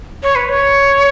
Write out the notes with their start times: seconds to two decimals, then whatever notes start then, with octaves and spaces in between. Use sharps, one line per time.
0.23 C#5
0.35 B4
0.49 C#5